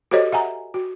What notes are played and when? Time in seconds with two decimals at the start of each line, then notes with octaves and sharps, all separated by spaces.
0.11 F#4 G4 A4 C5 C#5 D#5
0.32 E5 F#5 G#5 A#5
0.74 F#4